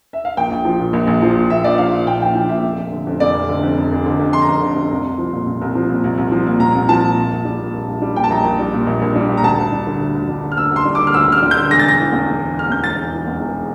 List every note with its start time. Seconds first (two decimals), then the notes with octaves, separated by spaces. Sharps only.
0.13 E5
0.25 F5
0.37 A#1 G5
0.51 A#1
0.65 F3
0.79 A#2
0.93 A#1
1.07 A#1
1.22 F3
1.36 A#2
1.50 A#1 E5
1.64 A#1 D5
1.78 F3 F5
1.92 A#2
2.06 A#1 G5
2.21 A#1 G5
2.35 F3 G5
2.49 A#2 E5
2.63 F1
2.77 F1
2.92 D3
3.07 F2
3.20 F1 D5
3.34 F1
3.49 D3
3.63 F2
3.78 F1
3.92 F1
4.06 D3
4.19 F2
4.33 F1 C6
4.42 A#5
4.48 F1 C6
4.61 D3
4.77 F2
4.91 C2
5.04 C2
5.18 F3
5.33 A#2
5.46 C2
5.61 C2
5.75 F3
5.89 A#2
6.04 C2
6.18 C2
6.32 F3
6.46 A#2
6.60 C2 A#5
6.75 C2
6.89 F3 A5
7.03 A#2
7.17 A#1
7.31 A#1
7.45 G3
7.59 A#2
7.74 A#1
7.88 A#1
8.02 G3
8.16 A#2 G5
8.24 A5
8.30 A#1 A#5
8.44 A#1
8.59 G3
8.74 A#2
8.87 A#1
9.02 A#1
9.15 G3
9.29 A#2
9.37 A#5
9.43 D2 A5
9.58 D2
9.72 G3
9.87 D3
10.01 D2
10.15 D2
10.29 G3
10.44 D3
10.52 F6
10.57 D2 E6
10.71 D2
10.76 C6
10.85 G3
10.95 D3 D6
11.07 F6
11.14 D2 E6
11.28 D2 F6
11.42 G3
11.51 G6
11.56 D3
11.70 E1 A#6
11.79 A6
11.85 E1 A#6
11.99 E3
12.12 E2
12.27 E1
12.41 E1
12.55 E3 F6
12.69 E2 G6
12.84 E1 A6
12.98 E1
13.12 E3
13.27 E2
13.41 E1